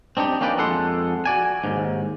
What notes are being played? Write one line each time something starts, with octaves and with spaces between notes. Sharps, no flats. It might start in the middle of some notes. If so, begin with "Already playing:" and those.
C4 D4 D#4 G4
A#3 C#4 D#4 G4 B4 D5
F2 G#3 A4 F#5 C6
F#4 D5 G#5
D#2 G#2